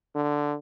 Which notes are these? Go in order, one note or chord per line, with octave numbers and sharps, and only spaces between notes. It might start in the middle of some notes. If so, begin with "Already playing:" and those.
D3